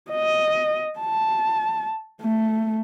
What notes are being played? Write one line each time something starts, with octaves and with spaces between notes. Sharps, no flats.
D#5
A5
A3